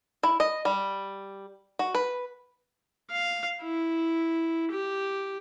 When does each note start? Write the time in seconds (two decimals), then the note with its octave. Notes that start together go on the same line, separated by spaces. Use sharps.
0.23 E4
0.40 D#5
0.65 G3
1.79 F#4
1.95 B4
3.10 F5
3.62 E4
4.71 G4